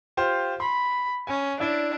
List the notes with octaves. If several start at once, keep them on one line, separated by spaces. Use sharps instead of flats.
F4 G4 C5
B5 C6
C#4 G#5
D4 E4 D5 E5